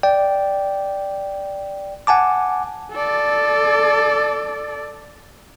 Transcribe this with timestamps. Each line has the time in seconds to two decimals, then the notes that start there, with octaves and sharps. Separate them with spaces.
0.03 D5 G5
2.07 F#5 G#5 A5 D6
2.92 A4 D5